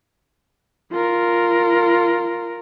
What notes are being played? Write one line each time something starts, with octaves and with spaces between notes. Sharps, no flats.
F4 A#4